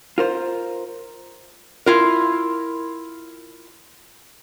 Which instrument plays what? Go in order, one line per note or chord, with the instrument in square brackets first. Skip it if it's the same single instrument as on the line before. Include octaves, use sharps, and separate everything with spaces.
[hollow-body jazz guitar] F4 A#4 C5
[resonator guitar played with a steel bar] E4 F4 A#4